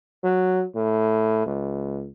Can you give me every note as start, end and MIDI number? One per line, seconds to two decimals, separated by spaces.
0.24 0.63 54
0.75 1.42 45
1.46 2.09 37